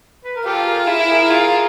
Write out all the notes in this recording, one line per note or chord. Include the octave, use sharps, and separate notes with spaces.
B4
A#4
F4 G4 A4
G#4 A#4
E4
G#4 A#4
F4